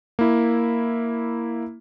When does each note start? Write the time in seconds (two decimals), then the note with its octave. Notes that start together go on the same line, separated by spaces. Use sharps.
0.19 A#3 E4